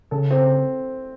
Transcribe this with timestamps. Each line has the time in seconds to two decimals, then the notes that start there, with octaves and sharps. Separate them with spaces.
0.11 C#3 A4
0.31 C4